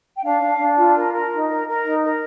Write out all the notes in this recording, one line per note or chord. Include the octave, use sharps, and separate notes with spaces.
G5
D4 F5
D4
D4
F4
A#4
A#4
D#4
A#4
A#4
D#4
A#4